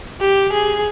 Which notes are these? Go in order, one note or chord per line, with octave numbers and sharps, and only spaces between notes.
G4
G#4